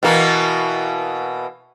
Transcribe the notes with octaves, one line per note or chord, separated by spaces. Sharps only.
B2 E3 A#3